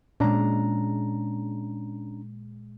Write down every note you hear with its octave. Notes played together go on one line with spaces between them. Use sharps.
A#2 G#3 C#4 D4 A#5